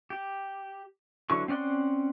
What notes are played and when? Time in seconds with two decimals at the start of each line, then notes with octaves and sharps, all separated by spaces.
0.10 G4
1.30 D3 E3 F#3 C#6
1.48 C4 C#4 D5 F#5 C6